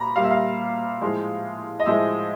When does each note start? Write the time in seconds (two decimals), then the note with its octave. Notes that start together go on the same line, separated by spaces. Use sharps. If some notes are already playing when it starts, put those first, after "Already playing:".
Already playing: A#2 A#5 B5
0.16 A#2 G3 F5
0.24 E5
0.31 F5
1.01 A2 F3 G#3
1.80 D#5
1.86 A2 F3 G#3 E5